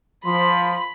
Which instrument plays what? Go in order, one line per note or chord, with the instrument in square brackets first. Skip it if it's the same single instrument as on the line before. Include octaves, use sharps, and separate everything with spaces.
[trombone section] F3 [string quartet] B5 [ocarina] C6